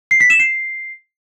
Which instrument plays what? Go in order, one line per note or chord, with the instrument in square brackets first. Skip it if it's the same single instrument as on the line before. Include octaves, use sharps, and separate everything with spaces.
[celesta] C7
B6
E7
C7